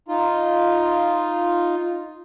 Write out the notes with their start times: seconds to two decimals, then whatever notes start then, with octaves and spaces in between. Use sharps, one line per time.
0.08 D#4 F4